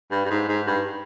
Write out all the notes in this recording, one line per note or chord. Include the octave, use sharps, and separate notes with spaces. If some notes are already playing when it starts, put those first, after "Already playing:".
G2
G2
G#2
G#2
G2